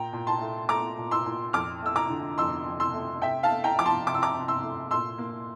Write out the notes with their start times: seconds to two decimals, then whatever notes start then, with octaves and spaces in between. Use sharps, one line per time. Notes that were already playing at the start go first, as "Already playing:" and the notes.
Already playing: A#2 G5 A#5
0.13 A#2
0.27 A5 C6
0.41 A3
0.69 A3 A#5 D6
0.98 A#2
1.11 C6 E6
1.26 A#2
1.53 F2 D6 F6
1.82 A3 E6
1.96 A#5 D6
2.10 D3
2.38 F2 C6 E6
2.66 F2
2.80 C6 E6
2.94 A3
3.22 C3 E5 G5
3.43 F5 A5
3.51 A3
3.64 G5 A#5
3.78 F3 D6
3.86 A5 C6
4.07 C3 D6
4.14 E6
4.22 A#5 D6
4.34 C3
4.48 C6 E6
4.62 A3
4.91 A#2 C6 E6
5.18 A#3